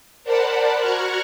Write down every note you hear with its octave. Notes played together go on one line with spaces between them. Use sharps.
A#4 C5 D5 F#5 A5 B5
F#4 A#5 C#6 F6 F#6 G#6